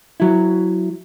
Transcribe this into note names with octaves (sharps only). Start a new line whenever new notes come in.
F#3 E4